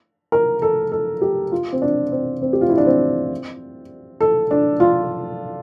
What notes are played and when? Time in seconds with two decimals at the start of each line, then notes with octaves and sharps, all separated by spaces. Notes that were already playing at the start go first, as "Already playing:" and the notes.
0.32 A#4
0.62 A4
0.92 A4
1.22 G4
1.52 F4
1.73 C4
1.82 D4
2.12 C4
2.42 C4
2.53 G4
2.61 F4
2.69 E4
2.78 D4
2.86 C4
4.21 A4
4.51 D4
4.80 F4